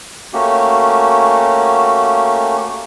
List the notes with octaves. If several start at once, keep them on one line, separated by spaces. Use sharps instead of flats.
A3 A#3 C#4 F#4 G4